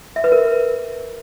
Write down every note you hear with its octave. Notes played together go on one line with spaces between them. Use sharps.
E5
B4
A#4